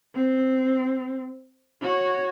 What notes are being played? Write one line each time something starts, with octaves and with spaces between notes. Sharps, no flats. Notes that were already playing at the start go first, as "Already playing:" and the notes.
C4
F#4 C#5